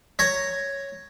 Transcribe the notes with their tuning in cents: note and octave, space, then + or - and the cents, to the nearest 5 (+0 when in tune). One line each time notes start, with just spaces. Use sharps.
C#5 +0 A#5 +0